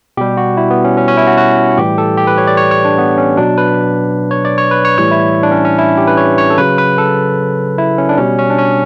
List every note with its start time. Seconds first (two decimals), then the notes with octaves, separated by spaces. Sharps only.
0.17 B2 G3 G4
0.37 F#4
0.57 E4
0.71 B3
0.84 C#4
0.97 C#4
1.08 C#4
1.17 E4
1.27 F#4
1.37 F#4
1.78 A2 E3 G3 G4
1.98 A4
2.17 G4
2.27 B4
2.38 C#5
2.47 D5
2.57 C#5
2.71 C#5
2.85 D4
2.98 B3
3.18 C#4
3.37 B2 F#3 D4
3.58 B4
4.31 C#5
4.45 D5
4.58 C#5
4.71 B4
4.85 C#5
4.98 A2 E3 G3 C#5
5.11 E4
5.43 D4
5.51 C#4
5.65 C#4
5.78 E4
5.98 G4
6.07 B4
6.17 C#5
6.38 C#5
6.50 A4
6.58 C#3 F#3 B4
6.78 B4
6.98 A4
7.78 E4
7.98 C#4
8.09 D4
8.18 B2 G3 C#4
8.38 C#4
8.50 D4
8.58 C#4